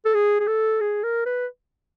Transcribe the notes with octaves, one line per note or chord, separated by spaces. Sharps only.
A4
G#4
G#4
A4
G#4
A#4
B4